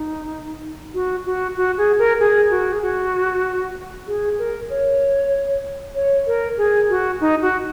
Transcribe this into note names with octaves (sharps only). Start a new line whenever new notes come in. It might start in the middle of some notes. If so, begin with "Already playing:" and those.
Already playing: D#4
F#4
F#4
F#4
G#4
A#4
G#4
F#4
G#4
F#4
G#4
A#4
C#5
C#5
A#4
G#4
F#4
D#4
F#4